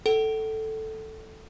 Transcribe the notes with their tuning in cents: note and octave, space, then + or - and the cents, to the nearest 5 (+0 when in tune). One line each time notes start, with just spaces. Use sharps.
A4 +0 F#5 +45